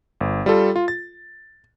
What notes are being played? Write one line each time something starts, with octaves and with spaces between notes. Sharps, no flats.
G1
G3 F4 A4
F4
A6